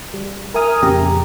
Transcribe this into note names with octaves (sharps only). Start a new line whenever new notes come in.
G3
A#4 E5 G#5 D#6 F6
F2 A#2 C#3 G4 A#5